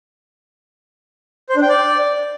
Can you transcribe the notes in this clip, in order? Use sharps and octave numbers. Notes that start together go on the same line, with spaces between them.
C5
D4
G5
D5